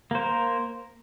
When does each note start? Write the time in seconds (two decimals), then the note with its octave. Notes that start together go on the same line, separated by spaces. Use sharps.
0.11 A#3
0.15 C5
0.19 A#4